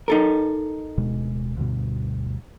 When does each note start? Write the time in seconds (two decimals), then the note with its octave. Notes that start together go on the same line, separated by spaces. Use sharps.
0.08 D#4 A4 A#4
0.97 D1 B2 G#3
1.57 D2 G2 B2